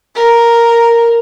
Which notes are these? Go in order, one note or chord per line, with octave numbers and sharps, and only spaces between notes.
A#4